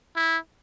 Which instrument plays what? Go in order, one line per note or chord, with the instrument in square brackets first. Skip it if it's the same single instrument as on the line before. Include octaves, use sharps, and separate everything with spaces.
[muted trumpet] E4